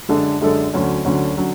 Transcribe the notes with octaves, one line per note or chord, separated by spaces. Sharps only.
F#2 D3 G#3 D4 A4
F#2 D3 G#3 D4 A4
D2 D3 F#3 C#4
D2 D3 F#3 C#4
D3 F#3 C#4